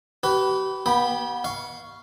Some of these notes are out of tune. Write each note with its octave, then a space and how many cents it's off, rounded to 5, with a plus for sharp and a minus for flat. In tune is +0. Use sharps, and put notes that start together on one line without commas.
G4 -40 B4 +0
B3 -35 G5 +0 B5 -5
F5 -10 C#6 +5